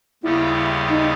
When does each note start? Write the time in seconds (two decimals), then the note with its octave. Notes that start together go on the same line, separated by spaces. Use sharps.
0.23 D#2 C#3 G3 B3 E4 G4
0.90 D#4